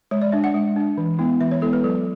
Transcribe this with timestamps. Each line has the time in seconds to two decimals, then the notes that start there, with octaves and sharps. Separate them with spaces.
0.11 G#3 C#5
0.22 D5
0.32 D4 E5
0.44 F#5
0.54 G#3
0.76 D4
0.98 E3
1.19 G#3 B3 E4
1.41 E3 E5
1.51 C#5
1.62 G#3 B3 E4 A4
1.73 B4
1.84 F#3 A4